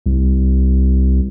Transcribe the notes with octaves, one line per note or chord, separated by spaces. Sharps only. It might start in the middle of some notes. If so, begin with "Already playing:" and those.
C2